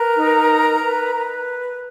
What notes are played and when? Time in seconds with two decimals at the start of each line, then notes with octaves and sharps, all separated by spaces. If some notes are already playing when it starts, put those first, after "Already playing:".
Already playing: A#4 B4 A#5
0.16 D#4
0.49 B4
0.83 B4
1.15 B4